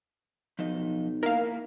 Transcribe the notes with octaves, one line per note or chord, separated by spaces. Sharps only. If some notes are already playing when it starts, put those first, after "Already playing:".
B1 F3 D#4 D#5
A#3 D#4 E4 A#4 F5